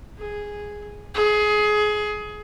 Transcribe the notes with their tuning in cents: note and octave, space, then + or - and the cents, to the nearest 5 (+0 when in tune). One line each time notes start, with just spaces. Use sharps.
G#4 -5
G#4 +20